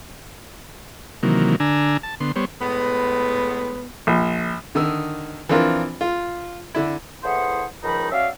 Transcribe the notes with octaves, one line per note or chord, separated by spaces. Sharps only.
C3 D#3 E3 F#3 A#3
D3 D4 G#5 A#5 E6
A5
D3 B3 C6
G3 B3 C5 C#5
A2 G#3 B3
A#1
D3 D#3 D#6 E6
E3 F3 C4 D4 F4 A#4
F4
D3 D4 E4
A2 E3 G#4 C5 F#5
C#2 D#3 F3 D#4 B5
C#4 F#4 D5 E5 F5